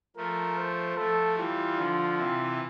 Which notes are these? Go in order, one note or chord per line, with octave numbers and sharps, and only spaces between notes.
F3 A3 A#4
C5
F3 A3 A4
E3 G3 F4
D3 F3
C3 E3